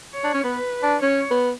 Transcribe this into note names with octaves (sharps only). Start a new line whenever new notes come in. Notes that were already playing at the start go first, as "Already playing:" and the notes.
C#5
D4
C#4
B3 B4
D4
C#4 C#5
B3